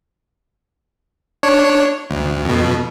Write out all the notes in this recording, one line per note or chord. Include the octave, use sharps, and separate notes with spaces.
D4 C#5
D2
F2 B2